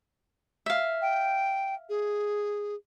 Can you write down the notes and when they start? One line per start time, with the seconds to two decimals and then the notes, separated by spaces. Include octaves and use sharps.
0.66 E5 F5
1.02 G5
1.89 G#4